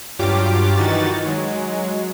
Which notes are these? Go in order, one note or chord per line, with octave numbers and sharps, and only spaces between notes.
G2 F#3 G3 F4 G4 D6
D#3 E3 D#4 F#4 A6
F#3 G#3